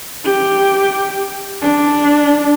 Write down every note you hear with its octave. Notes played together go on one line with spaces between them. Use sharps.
G4
D4